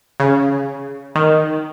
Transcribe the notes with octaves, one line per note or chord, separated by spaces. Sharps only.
C#3
D#3